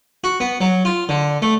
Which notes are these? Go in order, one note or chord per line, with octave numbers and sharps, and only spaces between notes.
F#4
B3
F#3
F4
D3
A3